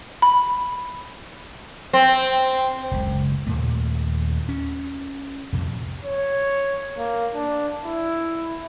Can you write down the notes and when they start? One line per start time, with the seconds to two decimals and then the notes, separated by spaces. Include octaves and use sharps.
0.22 B5
1.93 C4
2.91 F#1 C#2
3.47 D#2 A#2 A3
4.49 C#4
5.52 C2 F2 A#2
6.05 C#5
6.98 A#3
7.34 D4
7.85 E4